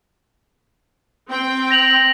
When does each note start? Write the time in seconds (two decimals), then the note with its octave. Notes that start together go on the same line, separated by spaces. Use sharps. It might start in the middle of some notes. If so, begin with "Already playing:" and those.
1.30 C4 G5
1.71 A#6 F7 F#7